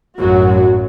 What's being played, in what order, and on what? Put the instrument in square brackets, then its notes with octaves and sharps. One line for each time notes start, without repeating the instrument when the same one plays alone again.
[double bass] A1 F#2 [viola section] F#3 F#4